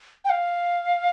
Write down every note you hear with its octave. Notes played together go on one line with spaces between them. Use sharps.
G5
F5